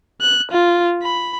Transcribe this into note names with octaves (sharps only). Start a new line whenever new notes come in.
F#6
F4
B5